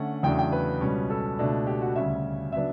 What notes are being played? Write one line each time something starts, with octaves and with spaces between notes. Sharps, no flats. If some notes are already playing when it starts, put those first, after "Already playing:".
Already playing: D3 A3 C#4 F#5
E2 C#3 F#3 A3 D4 G5
G5
B4
C#2 B2 G3 C#4
A4
C#2 B2 A3 D4
G4
F#4
D2 C#3 G3 C#4 E5
C#3 F#3 B3 D4 E5